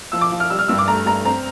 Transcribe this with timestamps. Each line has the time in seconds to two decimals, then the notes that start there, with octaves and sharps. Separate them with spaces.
0.12 F3 E6
0.21 D6
0.32 F3
0.40 F6
0.50 G3 E6
0.59 F6
0.68 G2 E6
0.78 D6
0.88 A3 A#5
1.06 G2 A#5
1.25 C4 A#5